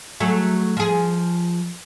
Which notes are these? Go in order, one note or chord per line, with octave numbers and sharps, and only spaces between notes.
F#3 A3 G#4
F3 G#4